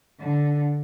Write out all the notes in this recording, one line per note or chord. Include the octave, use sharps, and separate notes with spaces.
D3